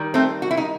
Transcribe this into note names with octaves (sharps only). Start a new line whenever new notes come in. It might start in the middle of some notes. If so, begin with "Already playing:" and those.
Already playing: D#3 G3
A3 C4
F#4
E4
D#4